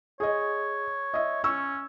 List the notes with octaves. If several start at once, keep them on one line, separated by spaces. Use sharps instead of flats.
G#4 C#5 D#5
D#5 E5
C#4 C#6 E6